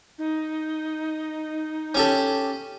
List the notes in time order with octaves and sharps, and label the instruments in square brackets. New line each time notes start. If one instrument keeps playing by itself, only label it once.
[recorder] D#4
[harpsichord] C#4 G4 A4